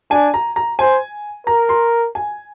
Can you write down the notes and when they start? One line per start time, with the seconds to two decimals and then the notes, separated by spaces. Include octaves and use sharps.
0.11 D4 G#5
0.34 A#5
0.56 A#5
0.79 C5 G#5
1.47 A#4 A#5
1.69 C6
2.15 G#5